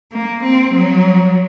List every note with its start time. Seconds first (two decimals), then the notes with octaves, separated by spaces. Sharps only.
0.12 A#3
0.44 C4
0.74 F#3